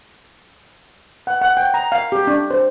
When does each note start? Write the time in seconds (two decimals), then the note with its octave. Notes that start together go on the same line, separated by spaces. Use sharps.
1.27 F#5
1.42 F#5
1.57 G5
1.74 A#5
1.92 F5
2.12 G4
2.27 D4
2.51 C5